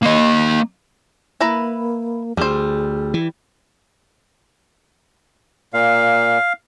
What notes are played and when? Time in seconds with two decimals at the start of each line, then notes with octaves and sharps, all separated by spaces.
0.03 A#3 D#5
1.41 A#3 E4 B4 A#5
2.37 D2 G3 G#4 C5
3.14 E3
5.74 A#2 F5